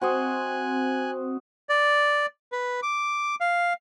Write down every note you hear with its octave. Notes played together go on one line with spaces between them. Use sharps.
C4 F#4 C5 D#5 G#5 F#6
D5
B4
D6
F5